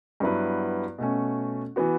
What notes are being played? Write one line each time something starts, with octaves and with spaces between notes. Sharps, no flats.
G2 F#3 B3 E4 B4
B2 A3 C#4
E3 B3 F#4